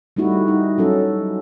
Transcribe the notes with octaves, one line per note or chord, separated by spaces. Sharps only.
G3 A3 D#4 E4 F#4
D#4
F#3 C#4 A4